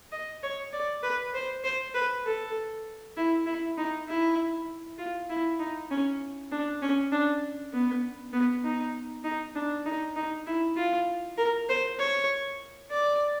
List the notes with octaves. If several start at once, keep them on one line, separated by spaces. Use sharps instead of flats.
D#5
C#5
D5
B4
C5
C5
B4
A4
E4
E4
D#4
E4
F4
E4
D#4
C#4
D4
C#4
D4
B3
B3
D#4
D#4
D4
D#4
D#4
E4
F4
A#4
C5
C#5
D5